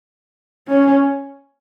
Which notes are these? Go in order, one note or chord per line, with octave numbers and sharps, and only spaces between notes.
C#4